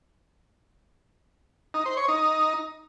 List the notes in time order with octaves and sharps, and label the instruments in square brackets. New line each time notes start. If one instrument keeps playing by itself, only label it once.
[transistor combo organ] D#4
C5
C#5
D#4